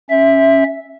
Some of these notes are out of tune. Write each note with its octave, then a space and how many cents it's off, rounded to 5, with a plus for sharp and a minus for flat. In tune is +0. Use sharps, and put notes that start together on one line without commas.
C#4 -5 E5 +0